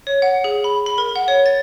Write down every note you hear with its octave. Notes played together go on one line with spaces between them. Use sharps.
C#5
F#5
G#4
B5
B5
A#4
F#5
C#5
A6